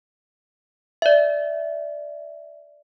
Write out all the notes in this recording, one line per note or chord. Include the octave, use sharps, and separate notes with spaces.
D5 E5